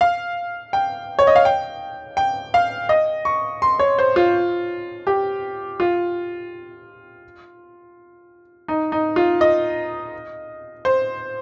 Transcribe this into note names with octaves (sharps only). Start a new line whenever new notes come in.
F5
G5
C#5
D#5
F5
G5
G5
F5
D#5
C#6
C6
C#5
C5
F4
G4
F4
D#4
D#4
F4
D#5
C5